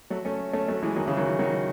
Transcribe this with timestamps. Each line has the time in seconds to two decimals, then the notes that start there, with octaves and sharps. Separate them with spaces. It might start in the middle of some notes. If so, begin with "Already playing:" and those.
0.10 F#3 A3
0.25 A3 C#4
0.53 A3 C#4
0.68 F#3 A3
0.83 E3 G#3
0.96 D#3 F#3
1.06 C#3 E3
1.17 D#3 F#3
1.39 D#3 F#3